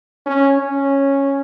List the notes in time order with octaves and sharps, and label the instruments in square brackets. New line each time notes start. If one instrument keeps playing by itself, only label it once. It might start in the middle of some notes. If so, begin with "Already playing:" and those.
[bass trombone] C#4
C#4